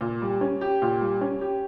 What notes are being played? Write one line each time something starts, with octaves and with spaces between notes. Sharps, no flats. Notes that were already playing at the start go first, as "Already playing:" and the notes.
A#2
G3
C#4
G4
A#2
G3
C#4
G4